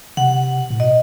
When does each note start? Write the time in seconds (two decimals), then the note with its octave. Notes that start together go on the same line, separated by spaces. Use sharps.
0.17 C3 F#5
0.70 A2
0.80 B2 D#5